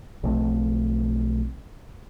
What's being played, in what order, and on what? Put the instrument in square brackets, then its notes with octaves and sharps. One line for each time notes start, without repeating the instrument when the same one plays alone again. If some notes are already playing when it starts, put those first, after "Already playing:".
[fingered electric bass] B1 F3 A3 C4